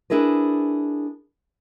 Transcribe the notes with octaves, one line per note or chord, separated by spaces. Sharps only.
D4 E4 G#4 A#4 B4